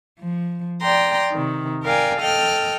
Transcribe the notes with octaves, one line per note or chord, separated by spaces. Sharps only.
F3
D5 G5 A#5 C6
C3 D#3
A#4 D5 F5 G5 G#5
A4 D#5 G5 F6